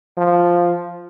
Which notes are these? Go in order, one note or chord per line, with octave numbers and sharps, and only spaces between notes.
F3